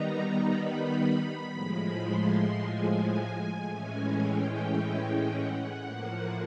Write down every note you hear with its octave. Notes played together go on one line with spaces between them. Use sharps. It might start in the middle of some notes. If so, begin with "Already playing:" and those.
Already playing: D#3 G3 B3 D#4 A#5
B5
A2 F3 G#3
C6
G#5
A2 E3 G#3 C#4 G#5
G5
F#5
A2 F3 A#3